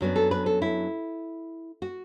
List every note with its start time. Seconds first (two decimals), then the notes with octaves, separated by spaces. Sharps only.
0.01 F#2 F#3 B3 D4
0.16 A4
0.31 B4
0.46 A4
0.62 E4
1.82 F#4